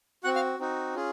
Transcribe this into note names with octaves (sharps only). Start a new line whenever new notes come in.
C4 F#4 F#5 F#6
F5 F6
C4 D#4 F#4
C#4 F4 G#4